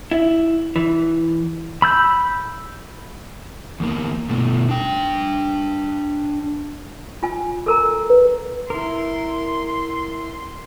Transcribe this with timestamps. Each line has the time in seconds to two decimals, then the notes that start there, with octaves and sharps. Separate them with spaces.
0.11 E4
0.76 E3
1.82 B5 E6 G6
3.80 E2 A#3
4.29 B2 A3
4.69 D4 G5
7.23 F4 G#5
7.66 A4 A#4 A#5
8.10 B4
8.70 E4 A#4 C6